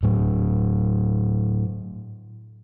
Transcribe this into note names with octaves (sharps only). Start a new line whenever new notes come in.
A2 F#3